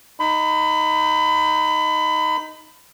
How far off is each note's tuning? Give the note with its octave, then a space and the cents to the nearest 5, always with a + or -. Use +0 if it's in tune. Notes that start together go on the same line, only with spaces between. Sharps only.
D#4 +0 B5 +30